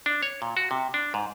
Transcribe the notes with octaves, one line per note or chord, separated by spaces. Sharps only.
D4
C#5
A#2
F#4
C3
D4
G#2